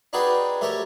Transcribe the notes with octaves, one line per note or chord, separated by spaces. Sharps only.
D4 D#4 F#4 G#4 B4 G5
A3 G4 A#4 C#5